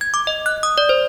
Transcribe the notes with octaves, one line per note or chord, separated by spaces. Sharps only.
G#6
D6
D#5
F#6
D#6
D5
C5